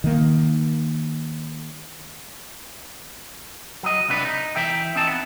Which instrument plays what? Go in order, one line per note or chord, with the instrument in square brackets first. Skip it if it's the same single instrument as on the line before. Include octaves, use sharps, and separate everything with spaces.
[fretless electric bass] D#3 A#3
[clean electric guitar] F#3 D#5
C#2 C3 D4 B4
D#4
E3 E5 G5
C4 D#4 A5
B3